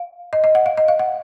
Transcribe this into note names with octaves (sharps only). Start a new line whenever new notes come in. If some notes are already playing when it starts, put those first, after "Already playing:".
Already playing: F5
D#5
D#5
F#5
F5
D#5
F5
F#5